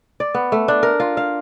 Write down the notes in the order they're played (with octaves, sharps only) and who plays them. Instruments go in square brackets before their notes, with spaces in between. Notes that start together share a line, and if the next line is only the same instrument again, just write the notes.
[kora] D5
B3
A3
D4
A#4
F4
F5